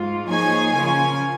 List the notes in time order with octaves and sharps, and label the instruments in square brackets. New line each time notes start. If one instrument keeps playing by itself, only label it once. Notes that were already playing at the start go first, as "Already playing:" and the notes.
Already playing: [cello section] G#2 G#3 F4
[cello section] F3 A#3 D#4 G#4 C#5 [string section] G#5
[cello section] C#3 F3 C#4 F4 A#4 [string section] G#5